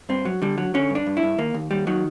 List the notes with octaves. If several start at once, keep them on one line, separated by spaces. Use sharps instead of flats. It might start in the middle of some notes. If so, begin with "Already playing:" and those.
G2 C4
F#3
D3 G3
F#3
D3 C#4
G2 D4
G2
E4
G2
D#2 A#3
D#2
D#2 G3
D#3 F#3